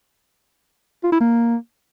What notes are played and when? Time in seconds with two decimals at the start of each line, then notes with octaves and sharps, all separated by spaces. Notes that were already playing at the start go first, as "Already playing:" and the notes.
1.04 F4
1.12 E4
1.21 A#3